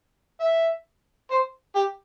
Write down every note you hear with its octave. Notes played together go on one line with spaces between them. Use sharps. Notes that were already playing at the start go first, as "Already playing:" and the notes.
E5
C5
G4